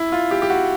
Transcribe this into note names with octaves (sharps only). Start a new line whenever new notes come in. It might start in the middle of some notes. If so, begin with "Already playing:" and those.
Already playing: E4
F4
G4
G4
F#4